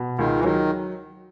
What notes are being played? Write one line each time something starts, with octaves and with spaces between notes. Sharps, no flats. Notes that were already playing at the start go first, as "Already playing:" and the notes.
Already playing: B2
C#2 D#3
E3
D#3 F#3